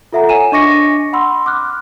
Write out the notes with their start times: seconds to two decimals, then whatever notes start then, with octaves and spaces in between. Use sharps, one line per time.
0.13 F4 A4 E5 F#5 A#5
0.29 C#5 F#5 G#5 D#7 E7
0.52 D4 D#5 C#6 D6 A#6 C#7
1.13 F#5 B5 C6 E6
1.46 D6 F6 F#6